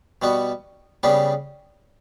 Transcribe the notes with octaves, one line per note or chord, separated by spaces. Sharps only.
B2 G3 B3 F#4
C#3 G3 B3 D4 G4